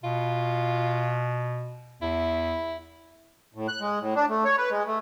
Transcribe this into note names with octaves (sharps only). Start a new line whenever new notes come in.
B2 F4
E2 E4
A2
F#6
G#3
A2
D4
A3
C#5
B4
G#3
A3